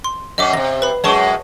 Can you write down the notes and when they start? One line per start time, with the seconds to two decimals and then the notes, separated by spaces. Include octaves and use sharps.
0.04 C6
0.38 F#2 C#4 D#5 E5 D6
0.53 F#2 C3 A#6
0.82 B4 B5
1.04 F#2 G#3 C#5 A5 C#6